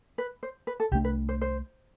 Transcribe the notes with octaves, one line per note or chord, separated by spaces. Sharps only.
B4
C5
B4
A4
C2 B2 A3 D4 G4
B4
C5
C5